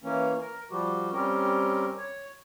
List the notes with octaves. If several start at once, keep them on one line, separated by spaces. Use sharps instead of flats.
E3 A#3 C#4
A#4
F3 G3 F#4 G4
G3 C4 C#4 G4 A#4
C#5